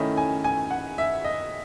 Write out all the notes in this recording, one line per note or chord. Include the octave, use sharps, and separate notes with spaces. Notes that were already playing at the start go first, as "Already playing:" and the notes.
Already playing: D#3 A3 C#4 E4 D#5
G#5
G#5
F#5
E5
D#5